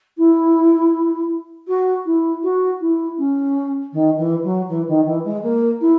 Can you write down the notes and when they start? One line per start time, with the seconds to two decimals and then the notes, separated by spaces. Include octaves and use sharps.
0.18 E4
1.68 F#4
2.06 E4
2.43 F#4
2.81 E4
3.18 C#4
3.93 D#3
4.18 E3
4.44 F#3
4.69 E3
4.88 D#3
5.06 E3
5.25 G#3
5.43 A#3
5.81 E4